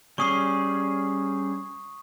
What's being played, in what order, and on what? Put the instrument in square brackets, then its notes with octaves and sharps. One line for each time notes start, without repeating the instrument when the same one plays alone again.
[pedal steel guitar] G3 C#4 G#4 [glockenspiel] C#6 D#6 C7